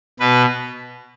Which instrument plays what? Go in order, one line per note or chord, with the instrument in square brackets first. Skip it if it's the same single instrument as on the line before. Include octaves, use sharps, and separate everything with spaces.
[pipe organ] B2 B4